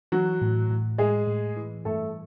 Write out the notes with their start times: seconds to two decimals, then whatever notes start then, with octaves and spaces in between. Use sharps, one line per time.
0.12 E3 F#3 F#4
0.42 A2
0.70 A2
0.98 A2 G#3 G#4
1.27 A2
1.57 E3
1.85 G2 A3 A4